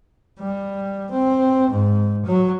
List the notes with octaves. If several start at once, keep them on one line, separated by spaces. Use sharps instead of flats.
G3
C4
G#2
F#3